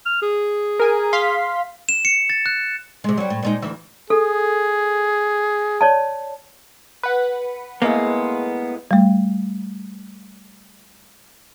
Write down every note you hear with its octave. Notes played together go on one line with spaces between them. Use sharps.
F6
G#4
A#4 G#5
F5 C6 B6
E7
C#7
A6
F#6
C3 G#3
F#3 G3
A2
A#2 G#3 D#4
D2 E3 E5
G#4 A4
C#5 D5 A5
B4 F#5
A2 G#3 A#3 B3 F5
G3 A3